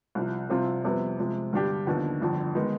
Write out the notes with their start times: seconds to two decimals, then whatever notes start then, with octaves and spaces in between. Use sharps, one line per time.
0.15 C2 C3 F3
0.50 C2 C3 F3 C4 F4
0.84 F2 C3 G3 B3
1.19 C3 F3 G#3
1.53 G2 D3 G3 D4 G4
1.87 D#2 D3 F3 B3 D#4
2.21 G1 F2 D3
2.55 D#3 G#3 B3 D#4